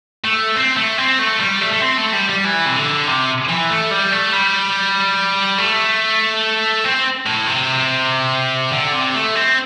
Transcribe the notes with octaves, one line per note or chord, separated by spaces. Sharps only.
A3
C4
A3
C4
A3
G3
A3
A3
C4
A3
G3
G3
E3
C3
D3
C3
E3
A3
G3
A3
G3
A3
C4
A2
C3
D3
C3
A3
C4